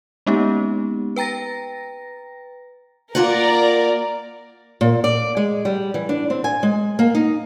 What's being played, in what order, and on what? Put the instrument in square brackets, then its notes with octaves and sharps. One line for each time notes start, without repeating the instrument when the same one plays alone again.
[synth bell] G#3 A#3 B3 C#4 D#4 G4
B4 G5 A#5 A6 A#6
[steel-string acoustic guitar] A#3 F4 F#5 [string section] A#4 D5
[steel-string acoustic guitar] A#2
D5
G#3
G3
E3
D4
C4
G#5
G#3
A#3
D#4